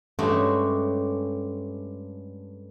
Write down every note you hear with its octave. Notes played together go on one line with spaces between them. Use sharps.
G2 G#3 A3 C#4 F#4 G4